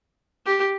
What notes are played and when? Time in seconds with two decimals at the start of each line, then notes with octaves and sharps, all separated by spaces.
0.46 G4